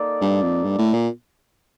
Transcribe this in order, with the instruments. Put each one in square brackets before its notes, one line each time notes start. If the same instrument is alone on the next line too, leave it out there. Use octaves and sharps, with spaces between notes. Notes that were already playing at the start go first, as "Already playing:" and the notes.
Already playing: [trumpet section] A#3 D#4 A4 D5
[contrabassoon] G2
F2
G2
A2
A#2